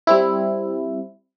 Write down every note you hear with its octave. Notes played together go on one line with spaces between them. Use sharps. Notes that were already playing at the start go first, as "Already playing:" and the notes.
G3 C4 E4